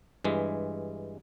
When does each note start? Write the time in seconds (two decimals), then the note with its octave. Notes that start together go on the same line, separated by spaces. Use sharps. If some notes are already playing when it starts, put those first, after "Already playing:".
0.24 G2 E3 G#3